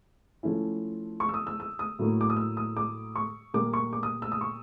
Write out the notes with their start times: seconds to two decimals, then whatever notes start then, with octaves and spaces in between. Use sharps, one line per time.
0.43 F3 A3 C#4 E4
1.20 C#6
1.29 E6
1.34 D#6
1.47 E6
1.60 E6
1.79 D#6
1.99 A2 F#3 A#3
2.21 D6
2.30 D#6
2.37 E6
2.57 D#6
2.77 D6
3.16 C#6
3.54 A#2 G3 A#3 D6
3.73 C#6
3.93 D6
4.03 D#6
4.22 E6
4.32 D#6
4.41 C#6